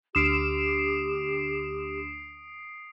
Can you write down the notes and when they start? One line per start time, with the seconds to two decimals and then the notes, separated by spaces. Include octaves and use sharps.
0.15 D2 G4 D#6 C7 D7 E7